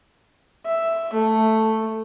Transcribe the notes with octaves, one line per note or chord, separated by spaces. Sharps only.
E5
A3